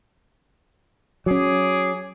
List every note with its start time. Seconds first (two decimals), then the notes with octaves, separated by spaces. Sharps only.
1.26 F#3 C#4 G#4 D6